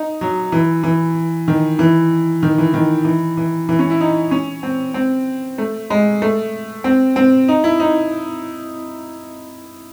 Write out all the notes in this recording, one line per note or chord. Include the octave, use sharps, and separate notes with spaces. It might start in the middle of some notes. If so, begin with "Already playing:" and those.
Already playing: D#4
F#3
E3
E3
D#3
E3
D#3
E3
D#3
E3
E3
E3
C#4
E4
D#4
C#4
C4
C4
A3
G#3
A3
C4
C4
D#4
E4
D#4